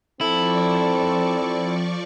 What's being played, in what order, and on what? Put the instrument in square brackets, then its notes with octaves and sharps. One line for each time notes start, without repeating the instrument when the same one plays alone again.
[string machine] F3 D5 C#6 [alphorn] C4 [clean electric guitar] E4 [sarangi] A4